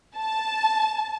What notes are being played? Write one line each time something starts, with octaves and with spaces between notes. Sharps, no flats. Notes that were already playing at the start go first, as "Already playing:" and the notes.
A5